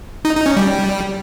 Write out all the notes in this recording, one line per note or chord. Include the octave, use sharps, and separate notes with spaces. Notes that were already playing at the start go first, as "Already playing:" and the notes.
D#4
D#4
C#4
G3